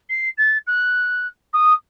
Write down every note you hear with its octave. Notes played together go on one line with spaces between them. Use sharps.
C7
A6
F#6
D#6